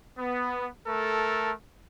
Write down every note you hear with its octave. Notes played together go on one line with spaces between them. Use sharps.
B3
A3 A4 A#4